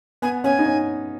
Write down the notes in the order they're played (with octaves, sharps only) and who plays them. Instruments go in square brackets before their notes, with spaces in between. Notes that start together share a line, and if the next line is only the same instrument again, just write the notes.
[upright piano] B3 [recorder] G#5
[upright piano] C#4 [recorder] G#5
[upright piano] D#4
C#4